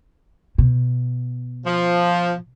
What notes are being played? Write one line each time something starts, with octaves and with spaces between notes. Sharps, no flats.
B2
F3